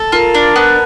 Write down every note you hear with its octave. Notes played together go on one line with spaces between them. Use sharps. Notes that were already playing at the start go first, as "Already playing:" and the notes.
Already playing: A4
F4 A#4
D4
B3